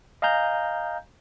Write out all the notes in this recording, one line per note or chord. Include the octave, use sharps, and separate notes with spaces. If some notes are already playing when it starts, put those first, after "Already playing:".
D#5 F5 G#5 A#5 G6